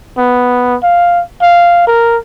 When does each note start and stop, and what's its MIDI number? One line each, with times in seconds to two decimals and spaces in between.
0.18 0.76 59
0.83 1.22 77
1.42 1.85 77
1.87 2.18 70